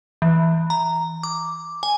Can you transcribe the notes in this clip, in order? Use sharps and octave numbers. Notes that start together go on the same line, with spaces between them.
E3
A#5
D6
G#5